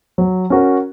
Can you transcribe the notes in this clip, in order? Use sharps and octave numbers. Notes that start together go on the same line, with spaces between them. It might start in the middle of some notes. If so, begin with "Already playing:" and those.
F#3
C#4 F#4 A#4